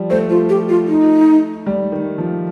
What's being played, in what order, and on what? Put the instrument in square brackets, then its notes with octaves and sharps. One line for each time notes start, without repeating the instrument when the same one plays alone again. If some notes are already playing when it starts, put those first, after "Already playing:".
Already playing: [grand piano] F3 G3
[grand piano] A3 [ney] C5
[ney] F4
G4
F4
D#4
[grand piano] G3
D#3
F3